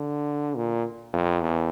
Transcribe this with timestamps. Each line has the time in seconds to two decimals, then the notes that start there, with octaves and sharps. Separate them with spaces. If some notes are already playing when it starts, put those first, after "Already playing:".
Already playing: D3
0.56 A#2
1.13 F2
1.41 E2